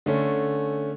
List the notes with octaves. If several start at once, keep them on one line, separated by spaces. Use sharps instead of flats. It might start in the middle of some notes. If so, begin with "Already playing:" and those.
D3 A3 C#4